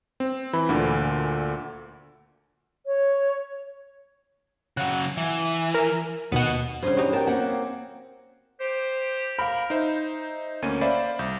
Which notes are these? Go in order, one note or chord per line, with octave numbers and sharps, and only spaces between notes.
C4
E3 B5
D2 A#2 D3
C#5
C#3 F#3 F#5
E3
A#4
D#2 B2 B3 D#5 F#5
G2 C#3 C5
G3 D#4 F#4
A#4 G5 A5
A#3 C4 C#4 F#5
G4 C5
A#4 F5 B5
D#4 C5 E5
D2 A#3 C#4 D#7
C5 D5 E5 F5 B5
C2 G6